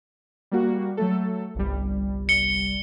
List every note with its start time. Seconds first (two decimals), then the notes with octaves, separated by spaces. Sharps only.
0.52 G3 A#3 F#4
0.97 F#3 A3 A4
1.55 G1 C2 G3
2.29 C#7 G7